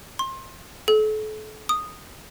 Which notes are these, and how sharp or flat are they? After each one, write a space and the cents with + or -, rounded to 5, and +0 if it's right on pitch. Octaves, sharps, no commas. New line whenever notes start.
C6 +25
A4 -35
D#6 -5